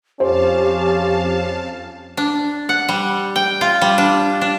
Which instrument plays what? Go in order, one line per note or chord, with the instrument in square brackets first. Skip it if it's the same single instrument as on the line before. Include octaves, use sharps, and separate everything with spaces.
[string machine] F2 F5 A5 [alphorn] C#4 [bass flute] G4 [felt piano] C5
[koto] D4
F#5
G3
G5
F4
G3
D4
D4